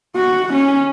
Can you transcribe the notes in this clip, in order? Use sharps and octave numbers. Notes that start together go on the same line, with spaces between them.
F#4
C#4